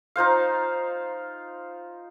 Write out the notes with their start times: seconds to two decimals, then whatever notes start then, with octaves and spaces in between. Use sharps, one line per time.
0.16 D#4 F4 C5 F5